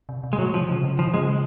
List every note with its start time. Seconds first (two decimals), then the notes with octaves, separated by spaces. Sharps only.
0.09 C3
0.24 C3
0.33 G#3
0.38 A#2 F#3
0.53 C3 F3
0.69 C#3 F3
0.84 C#3
0.99 D#3 F3
1.14 C#3 G#3
1.29 G#3